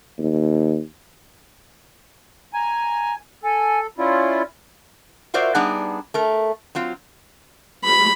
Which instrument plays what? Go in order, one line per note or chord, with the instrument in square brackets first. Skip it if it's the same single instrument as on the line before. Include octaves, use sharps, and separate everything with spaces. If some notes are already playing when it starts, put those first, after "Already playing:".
[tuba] D#2
[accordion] G#5 [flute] A#5
[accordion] A4 [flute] G#5
[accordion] C#4 E4 F4 [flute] D5
[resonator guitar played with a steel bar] F4 F#4 A#4 C5 D5 E5
G3 B3 D4 D#4 G#4 F#5
A3 A#4
F#3 C4 F4
[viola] B5